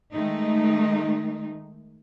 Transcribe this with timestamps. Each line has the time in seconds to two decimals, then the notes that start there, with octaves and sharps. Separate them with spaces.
0.14 D#3 G#3 A3 D#4